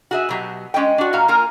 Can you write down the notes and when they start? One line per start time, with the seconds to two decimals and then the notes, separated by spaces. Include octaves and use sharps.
0.11 F#4 G#4 E5
0.29 B2 F#3 G4
0.74 G#3 C#4 D#5 G5
0.98 D4 F#4
1.13 A#2 F#4 F5 A#5
1.28 A#3 F4 A#4 G#5